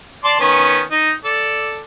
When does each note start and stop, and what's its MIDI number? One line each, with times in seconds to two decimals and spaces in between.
0.24 0.39 74
0.24 0.39 81
0.24 0.39 84
0.40 0.81 51
0.40 0.81 59
0.40 0.81 61
0.91 1.12 63
1.25 1.81 69
1.25 1.81 74